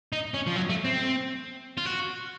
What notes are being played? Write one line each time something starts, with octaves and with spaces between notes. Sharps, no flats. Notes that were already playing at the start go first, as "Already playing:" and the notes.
D#4
C#4
F3
F#3
A3
C4
F4
F#4